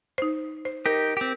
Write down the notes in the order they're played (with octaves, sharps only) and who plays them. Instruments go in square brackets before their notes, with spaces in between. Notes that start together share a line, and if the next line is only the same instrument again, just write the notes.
[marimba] D#4 C5
C5
[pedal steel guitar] D#4 G4 [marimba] A#4
[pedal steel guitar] C4 G4